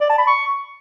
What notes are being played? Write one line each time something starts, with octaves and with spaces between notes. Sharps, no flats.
D5
A5
B5
C#6